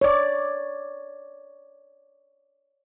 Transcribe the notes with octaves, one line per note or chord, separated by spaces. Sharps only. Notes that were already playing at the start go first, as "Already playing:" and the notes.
C#5 D5